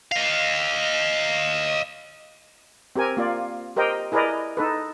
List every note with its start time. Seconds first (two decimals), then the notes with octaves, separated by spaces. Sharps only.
0.11 D#5 F5
2.96 C4 G4 A#4 G#5
3.17 A#3 F4 D5
3.76 G4 A#4 C5 D#5 G5
4.12 E4 G#4 A#4 B4 D5 D#5
4.57 D#4 A4 B4